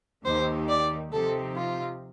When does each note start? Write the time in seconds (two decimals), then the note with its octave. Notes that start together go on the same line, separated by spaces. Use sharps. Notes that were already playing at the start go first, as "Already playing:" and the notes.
0.25 D#2 D#3 A#3 D#4 G4 C5
0.68 D5
1.12 C3 F3 C4 D#4 G4 A4
1.56 F4